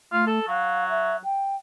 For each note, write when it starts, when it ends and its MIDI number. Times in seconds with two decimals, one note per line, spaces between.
0.13 0.40 57
0.13 0.25 65
0.27 0.47 69
0.48 1.17 54
0.48 0.88 77
0.89 1.16 76
1.24 1.56 79